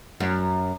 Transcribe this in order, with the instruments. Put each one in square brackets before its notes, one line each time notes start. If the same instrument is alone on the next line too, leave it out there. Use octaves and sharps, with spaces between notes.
[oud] F#2